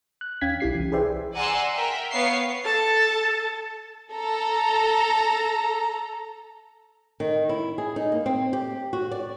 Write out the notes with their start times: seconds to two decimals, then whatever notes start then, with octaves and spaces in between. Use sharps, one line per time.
0.21 F#6
0.41 D#2 C#4 F5 G5 G#6 B6
0.60 B1 E4 G4 C7
0.75 C2 E3
0.92 G#4 B4 C5 D5 E5 G5
1.35 D5 F#5 G#5 A#5 C6 E6
1.75 A#4 E5 G5
2.11 B3 C#5 F5 C#6 C7
2.65 A4 A5
4.13 A4 A#5
7.20 D#3
7.49 E4
7.78 G#4
7.96 D#4
8.12 A#3
8.26 C4
8.53 G4
8.93 F#4
9.11 D5